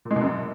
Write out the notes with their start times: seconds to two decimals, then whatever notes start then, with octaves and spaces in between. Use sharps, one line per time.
0.05 A#2
0.11 G#3
0.16 B2
0.21 F#2